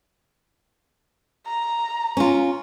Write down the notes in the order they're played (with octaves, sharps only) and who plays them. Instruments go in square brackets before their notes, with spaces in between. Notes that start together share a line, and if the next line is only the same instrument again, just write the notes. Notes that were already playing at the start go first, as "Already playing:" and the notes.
[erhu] A#5
[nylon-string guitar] C#4 F4